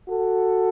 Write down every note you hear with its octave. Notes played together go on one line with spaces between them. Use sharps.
F#4 A4